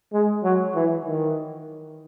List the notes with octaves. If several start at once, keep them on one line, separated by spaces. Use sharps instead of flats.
G#3
F#3
E3
D#3